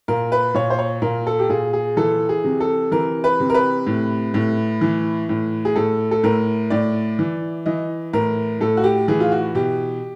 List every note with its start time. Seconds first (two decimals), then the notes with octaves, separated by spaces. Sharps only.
0.08 A#2 A#4
0.32 B4
0.54 A#2 C#5
0.70 C5
0.79 C#5
1.02 A#2 A#4
1.27 A4
1.39 G4
1.49 A#2 G#4
1.73 G#4
1.97 E3 A4
2.29 G#4
2.44 C3
2.60 A4
2.92 E3 A#4
3.24 B4
3.40 C3
3.50 A#4
3.54 B4
3.87 A2
4.34 A2
4.81 E3
5.29 A2
5.65 G#4
5.76 A2 A4
6.11 A4
6.23 A2 A#4
6.70 A2 D5
7.19 E3
7.66 E3 D#5
8.13 A2 A#4
8.61 A2 A4
8.77 F#4
8.84 G4
9.08 E3 G#4
9.20 F4
9.32 F#4
9.55 B2 G4